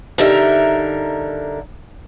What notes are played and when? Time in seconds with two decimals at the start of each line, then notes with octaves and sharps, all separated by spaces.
0.18 D3 G3 D#4 A#4 E5